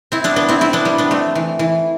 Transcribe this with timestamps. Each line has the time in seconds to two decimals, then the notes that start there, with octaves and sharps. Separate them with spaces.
0.12 C4 E4
0.24 B3 D4
0.36 B3 D4
0.48 C4 E4
0.61 C4 E4
0.73 B3 D4
0.85 G3 B3
0.98 B3 D4
1.11 A3 C4
1.35 E3
1.59 E3